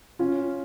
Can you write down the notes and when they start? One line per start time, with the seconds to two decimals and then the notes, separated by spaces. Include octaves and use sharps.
0.19 C#4 F4